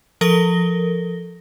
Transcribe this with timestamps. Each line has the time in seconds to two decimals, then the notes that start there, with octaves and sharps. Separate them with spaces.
0.21 F3 A4 A#4 A#6 G7